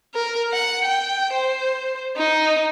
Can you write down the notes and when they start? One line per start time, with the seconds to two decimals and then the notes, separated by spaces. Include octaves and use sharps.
0.14 A#4
0.53 F#5
0.85 G5
1.34 C5
2.16 D#4